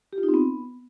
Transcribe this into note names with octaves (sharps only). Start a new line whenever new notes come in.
G4
F4
D#4
C4
B3